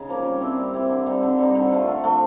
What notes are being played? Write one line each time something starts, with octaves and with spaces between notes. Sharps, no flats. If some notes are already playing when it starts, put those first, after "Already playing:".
Already playing: C#3 D#4
F3 A#3 C#4
G3
C4 E4 G4
G3
C4 E4 G4
D3
G3 C4 D#4
D3
G3 C4 D#4
D3
F3 A3
D3
F3 A3